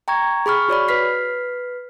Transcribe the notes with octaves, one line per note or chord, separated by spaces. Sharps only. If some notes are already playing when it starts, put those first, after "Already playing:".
G5 A#5 C#6 G#6
G#4 B5 C#6 F6
F#4 C#5 D5 B5
B4 F6 B6 C7